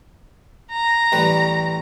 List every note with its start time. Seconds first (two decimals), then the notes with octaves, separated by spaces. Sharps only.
0.71 A#5
1.12 A1 G3 B4